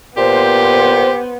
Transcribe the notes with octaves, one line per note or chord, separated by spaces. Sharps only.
A#2 B3 G4 C5